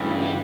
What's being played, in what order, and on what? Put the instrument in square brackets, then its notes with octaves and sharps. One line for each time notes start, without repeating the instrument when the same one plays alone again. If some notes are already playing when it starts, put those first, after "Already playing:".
Already playing: [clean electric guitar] D2 C#3 E3 [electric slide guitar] G2
[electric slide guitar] G3